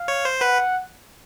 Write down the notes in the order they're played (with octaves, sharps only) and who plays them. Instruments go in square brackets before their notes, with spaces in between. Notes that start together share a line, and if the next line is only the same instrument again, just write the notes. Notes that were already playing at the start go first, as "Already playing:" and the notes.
Already playing: [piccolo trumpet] F5
[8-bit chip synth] C#5
C5
[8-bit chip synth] B4 [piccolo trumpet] F#5